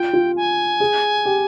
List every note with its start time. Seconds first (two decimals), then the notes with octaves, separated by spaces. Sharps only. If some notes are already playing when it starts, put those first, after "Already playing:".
Already playing: F4 G5
0.13 F4
0.36 G#5
0.80 G#4
1.25 G4